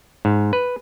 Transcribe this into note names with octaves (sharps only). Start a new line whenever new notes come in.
G#2
B4